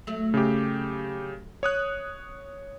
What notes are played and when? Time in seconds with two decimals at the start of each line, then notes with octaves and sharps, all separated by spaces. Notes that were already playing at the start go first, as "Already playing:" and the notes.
0.07 F#3 A3
0.34 C#3 G4
1.63 C#5 D#6 F#6